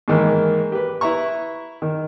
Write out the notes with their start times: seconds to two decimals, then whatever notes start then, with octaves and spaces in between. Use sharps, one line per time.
0.08 G#2 D#3 E3 A#3
0.72 G4 B4
1.01 E4 B4 E5 A#5 C#6
1.82 D#3